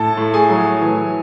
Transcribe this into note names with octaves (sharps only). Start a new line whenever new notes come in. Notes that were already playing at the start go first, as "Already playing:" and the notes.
Already playing: A2 A4 A5
A2
G#4 G#5
F#3
E3